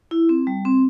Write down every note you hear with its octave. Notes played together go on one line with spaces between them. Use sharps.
E4
C4
G3
C4